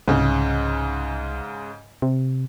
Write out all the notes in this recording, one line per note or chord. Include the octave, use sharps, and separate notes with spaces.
C2 G#2 C#3
C3